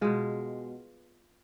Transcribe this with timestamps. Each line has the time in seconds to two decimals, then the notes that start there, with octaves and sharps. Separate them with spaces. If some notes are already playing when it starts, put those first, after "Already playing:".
0.01 B2 G#3 F4